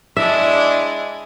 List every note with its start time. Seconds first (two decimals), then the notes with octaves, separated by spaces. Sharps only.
0.17 G#3 D4 E4 E5